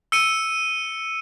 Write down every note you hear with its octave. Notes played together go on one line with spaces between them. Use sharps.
E6 C#7 D#7